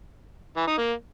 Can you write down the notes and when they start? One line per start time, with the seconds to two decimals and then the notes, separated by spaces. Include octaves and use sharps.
0.57 E3
0.67 D#4
0.78 A#3